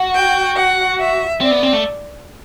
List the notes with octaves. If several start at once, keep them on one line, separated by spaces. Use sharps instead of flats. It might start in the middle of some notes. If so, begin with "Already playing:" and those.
Already playing: F#4
G5
F#5
E5
C4 D5
B3
C4
A3